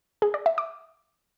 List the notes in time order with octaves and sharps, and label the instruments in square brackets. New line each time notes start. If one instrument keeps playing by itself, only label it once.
[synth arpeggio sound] G#4
D5
E5
D6